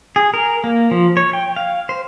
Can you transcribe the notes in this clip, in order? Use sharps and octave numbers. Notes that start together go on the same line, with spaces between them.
G#4
A#4
A#3
F3
C#5
G5
F5
C5